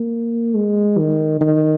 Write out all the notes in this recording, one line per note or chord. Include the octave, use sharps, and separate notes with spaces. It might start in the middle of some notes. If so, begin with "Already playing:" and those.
Already playing: A#3
G#3
D#3
D#3